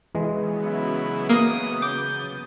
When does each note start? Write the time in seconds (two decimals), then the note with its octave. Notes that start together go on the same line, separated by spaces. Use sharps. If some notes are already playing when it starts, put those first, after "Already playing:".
0.15 C#3 E3 F#3 G#3 B3
0.64 E4
1.29 A#3 D#6
1.82 D6 D#6 G6 A6